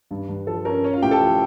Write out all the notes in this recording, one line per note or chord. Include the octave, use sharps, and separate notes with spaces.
G2
G2
F3 A4
C#4 A#4
C#4 C#5
F4 F5
A2 G4 G5
A4 A5
F3